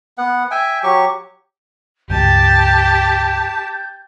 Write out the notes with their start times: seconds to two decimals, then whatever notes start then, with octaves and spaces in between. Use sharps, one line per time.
0.18 B3 F#5
0.51 E5 G5 G#5
0.83 F#3 G4 C#6
2.10 C#2 G2 G3 G4 A5 G6